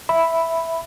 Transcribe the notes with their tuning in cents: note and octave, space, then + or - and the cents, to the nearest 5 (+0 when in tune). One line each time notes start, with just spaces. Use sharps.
E5 +0 B5 +0